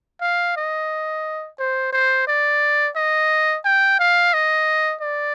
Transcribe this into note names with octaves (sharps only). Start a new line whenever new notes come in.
F5
D#5
C5
C5
D5
D#5
G5
F5
D#5
D5